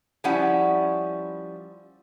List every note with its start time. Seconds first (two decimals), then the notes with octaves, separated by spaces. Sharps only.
0.24 F3 G3 C#4 E4 F#5